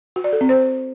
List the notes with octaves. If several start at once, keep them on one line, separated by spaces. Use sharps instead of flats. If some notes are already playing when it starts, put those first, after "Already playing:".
F#4
D5
A4
C4
C5